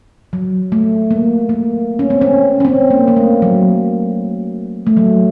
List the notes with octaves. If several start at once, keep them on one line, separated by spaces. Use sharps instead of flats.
F#3
A3
A#3
A#3
C#4
C4
C#4
C#4
C4
A#3
A#3
A3
F#3
A3
F#3